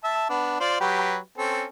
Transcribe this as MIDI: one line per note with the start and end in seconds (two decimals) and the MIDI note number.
0.04 0.27 76
0.04 0.27 81
0.30 0.60 59
0.30 0.60 62
0.60 0.80 65
0.60 0.80 72
0.60 0.80 74
0.80 1.17 54
0.80 1.17 67
0.80 1.17 71
1.38 1.65 60
1.38 1.65 61
1.38 1.65 69